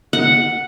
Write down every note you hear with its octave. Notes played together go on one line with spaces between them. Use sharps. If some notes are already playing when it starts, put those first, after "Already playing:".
F#5